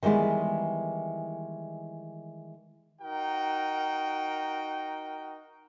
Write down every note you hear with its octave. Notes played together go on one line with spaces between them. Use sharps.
D#3 E3 G3 G#3 B3
D#4 F#4 A#4 G5